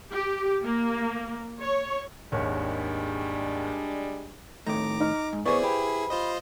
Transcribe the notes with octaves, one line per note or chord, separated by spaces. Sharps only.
G4
A#3
C#5
G#1 D#2 G3 G#3 D4 C#5
A2 D#3 A3 A#5 D6
D#4 D#5 F6
G#2
B3 E4 G#4 B4 C5 D5 C#6
G4 B5
F4 C5 D#5